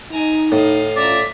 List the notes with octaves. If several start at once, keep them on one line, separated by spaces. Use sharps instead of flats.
D#4 G#5 A#5
A2 D#5 F5
C#4 F4 D5 E5 A#5